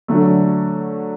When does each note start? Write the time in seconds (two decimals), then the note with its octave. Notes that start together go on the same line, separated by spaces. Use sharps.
0.08 D3 F#3 A3